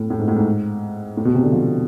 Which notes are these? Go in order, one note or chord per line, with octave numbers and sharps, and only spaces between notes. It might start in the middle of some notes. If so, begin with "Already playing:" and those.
Already playing: A2
A2
G#2
A2
G#2
A2
B2
C3
D3
F3